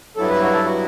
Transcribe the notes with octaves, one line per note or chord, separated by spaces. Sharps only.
G2 F#3 B3 E4 A4
B4
F#4
A4
F#4